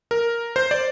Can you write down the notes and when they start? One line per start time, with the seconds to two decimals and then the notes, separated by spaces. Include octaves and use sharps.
0.11 A#4
0.56 C5
0.71 D5